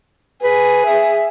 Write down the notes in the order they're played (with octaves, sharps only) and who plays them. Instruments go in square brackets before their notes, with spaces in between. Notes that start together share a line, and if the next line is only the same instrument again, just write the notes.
[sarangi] G#4 [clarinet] B4
[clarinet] E5